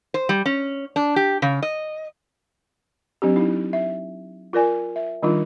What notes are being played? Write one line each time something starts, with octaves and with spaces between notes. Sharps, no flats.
C5
G3
C#4
D4
G4
C#3
D#5
F#3 C4 D4 G4
D#4 E4
E5
F4 A#4 D5 G#5
E5
D#3 G3 D4 D#4 F4